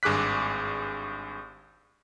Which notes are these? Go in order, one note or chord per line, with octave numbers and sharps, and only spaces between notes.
G#1 G2 G#4 D6 F#6 B6